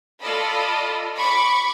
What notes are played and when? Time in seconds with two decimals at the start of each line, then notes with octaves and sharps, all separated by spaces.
0.21 F4 A4 D5 D#5 B5
1.18 B5 C#6 D6